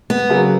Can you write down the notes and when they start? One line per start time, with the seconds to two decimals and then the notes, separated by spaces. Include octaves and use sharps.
0.10 B3
0.29 C#3 F#3 A#3